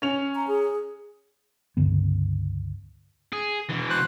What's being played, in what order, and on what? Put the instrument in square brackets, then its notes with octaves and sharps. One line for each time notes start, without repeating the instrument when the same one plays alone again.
[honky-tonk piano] C#4 F7
[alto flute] A#5
G#4
[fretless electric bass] C#2 G2 D3 B3
[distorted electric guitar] G#4
B2 E3
[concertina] C5 F#6